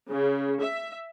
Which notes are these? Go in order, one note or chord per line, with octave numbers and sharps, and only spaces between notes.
C#3
E5